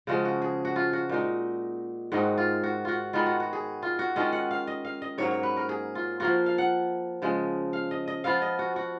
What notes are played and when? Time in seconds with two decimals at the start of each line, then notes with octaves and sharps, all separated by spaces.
0.07 C#3 F3 G#3 C#4 F#4
0.25 F#4
0.42 G#4
0.65 F#4
0.76 F4
0.93 F#4
1.09 A#2 G#3 D#4
2.12 G#2 D#3 G#3 D#4 F#4
2.38 F4
2.64 F#4
2.85 F4 F#4
3.13 D#3 G#3 B3 D#4 F4
3.26 F#4
3.40 F#4
3.53 G#4
3.82 F4
3.99 F#4
4.16 D#3 G#3 C#4 F4 D#5
4.32 F#5
4.51 F5
4.67 D#5
4.85 F5
5.02 D#5
5.18 G#2 F#3 A#3 C#5
5.31 C#5
5.43 B4
5.57 A#4
5.69 G#4
5.95 F4
6.20 F3 A#3 F4 F#4
6.46 F5
6.58 F#5
7.22 C#3 F3 G#3
7.73 F5
7.91 D#5
8.08 D#5
8.24 F3 B3 F4 F5
8.42 D#5
8.59 F#4
8.76 F#4